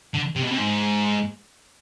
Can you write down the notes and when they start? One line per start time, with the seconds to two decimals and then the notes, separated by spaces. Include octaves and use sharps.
0.14 D3
0.36 C3
0.43 B2
0.51 C3
0.58 G#2